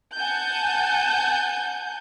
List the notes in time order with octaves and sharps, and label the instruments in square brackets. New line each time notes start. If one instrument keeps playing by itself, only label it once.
[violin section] F#5 G#5 A5 G6